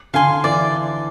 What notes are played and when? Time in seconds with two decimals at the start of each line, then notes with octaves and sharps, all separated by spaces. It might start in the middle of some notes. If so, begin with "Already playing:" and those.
0.14 D3 F5 G#5 C6
0.44 E3 D5